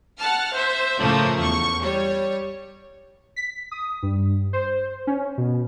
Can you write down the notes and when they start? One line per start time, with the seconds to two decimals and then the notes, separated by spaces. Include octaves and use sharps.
0.18 F#5 A5 F6
0.54 C5 E5
1.00 A2 C#3 F3 A3 A#3
1.41 E2 C#6
1.81 G3 C#5
3.36 B6
3.71 D#6
4.03 G2
4.53 C5
5.07 C#4
5.38 B2